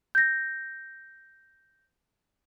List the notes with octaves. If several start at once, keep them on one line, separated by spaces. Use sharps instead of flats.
G6 A#6